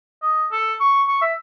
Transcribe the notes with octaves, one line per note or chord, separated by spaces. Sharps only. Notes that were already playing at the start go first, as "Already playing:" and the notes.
D#5
A4
C#6
C#6
E5